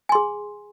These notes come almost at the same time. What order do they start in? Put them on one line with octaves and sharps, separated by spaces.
G#5 C6 G#4